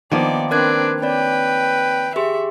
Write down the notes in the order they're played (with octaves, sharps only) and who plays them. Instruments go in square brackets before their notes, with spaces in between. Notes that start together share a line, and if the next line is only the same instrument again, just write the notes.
[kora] D#3 F3 A#3 [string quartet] B3 D5
[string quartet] C4 D4 B4 [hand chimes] A#4 F#6 G#6 [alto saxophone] D5
[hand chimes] C4 C#5 D5 [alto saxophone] B4 [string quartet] G5
[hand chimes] G4 G#4 C6 [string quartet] E5